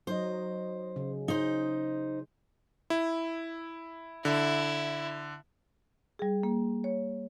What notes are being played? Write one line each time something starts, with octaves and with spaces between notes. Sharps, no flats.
F#3 D#4 C5 D#5
C#3
D#4 C5
E4
D3 E4
G3 G#4
A#3
C#5